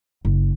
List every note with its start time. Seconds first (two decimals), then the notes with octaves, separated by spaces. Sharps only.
0.25 F#1